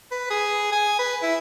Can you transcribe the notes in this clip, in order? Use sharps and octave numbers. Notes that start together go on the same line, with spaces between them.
B4
G#4
G#5
B4
E4